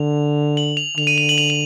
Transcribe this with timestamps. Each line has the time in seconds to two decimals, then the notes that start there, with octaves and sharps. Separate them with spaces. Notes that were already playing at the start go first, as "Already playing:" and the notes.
Already playing: D3 F7
0.57 F#7
0.77 F7
0.98 D3 F7
1.07 D#7
1.18 F7
1.29 F#7
1.38 F7
1.50 F7